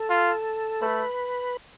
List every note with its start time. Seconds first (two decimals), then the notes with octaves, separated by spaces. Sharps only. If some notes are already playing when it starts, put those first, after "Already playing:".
Already playing: A4
0.10 F4
0.81 A3 B4